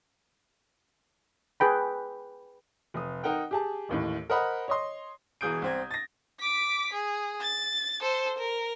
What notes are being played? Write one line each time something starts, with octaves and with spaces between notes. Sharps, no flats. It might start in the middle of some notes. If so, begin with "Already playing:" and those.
G#4 B4 G5 B5
F1 D#6
D#4 A#4 F#5 G5
G4 G#4 A5
A1 D#2 A2
A#4 C5 D#5 F#5 B5
C#5 D#5 C6
E1 E3 G#4 D#6 G6 D7
C2 C4 G#6
A6 A#6
D6 B6
G#4
A6
A4 C5
A#4